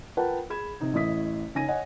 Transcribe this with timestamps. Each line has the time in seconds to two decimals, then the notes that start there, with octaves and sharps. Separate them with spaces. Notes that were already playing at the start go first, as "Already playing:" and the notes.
0.17 F4 A#4 B4 F#5 G5 A5
0.50 G#4 B5 G#6 E7
0.81 C3 D#4
0.93 A1 A3 E4 D#5 D#6 B6
1.55 C#3 D#4 G#5 A#6 D#7
1.68 C#5 D#5 F#5 G#5